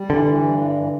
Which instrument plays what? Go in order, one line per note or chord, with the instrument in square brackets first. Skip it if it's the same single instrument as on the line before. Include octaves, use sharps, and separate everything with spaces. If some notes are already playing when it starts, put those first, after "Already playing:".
Already playing: [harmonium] G3
[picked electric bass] D3 [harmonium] E3
[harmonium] E3
G2
E3
E3